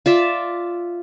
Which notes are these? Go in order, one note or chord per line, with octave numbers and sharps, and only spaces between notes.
F4 D5 E5